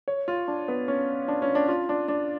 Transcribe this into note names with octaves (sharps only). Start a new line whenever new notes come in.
C#5
F4
D4
B3
C#4
D4
C#4
D4
F4
D4
D4